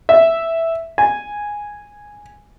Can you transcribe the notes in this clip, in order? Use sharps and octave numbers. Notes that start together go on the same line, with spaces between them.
E5
G#5